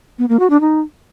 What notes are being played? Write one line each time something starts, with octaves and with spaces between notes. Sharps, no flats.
B3
A#3
F#4
D4
D#4